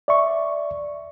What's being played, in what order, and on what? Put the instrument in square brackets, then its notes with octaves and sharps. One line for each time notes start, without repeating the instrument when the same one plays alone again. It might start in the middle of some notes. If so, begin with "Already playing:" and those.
[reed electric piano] D5 E5 C#6